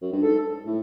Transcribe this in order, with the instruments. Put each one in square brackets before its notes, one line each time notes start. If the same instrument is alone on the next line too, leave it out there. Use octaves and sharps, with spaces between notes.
[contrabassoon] F#2
G2
[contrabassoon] G#2 [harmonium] A4
[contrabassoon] A2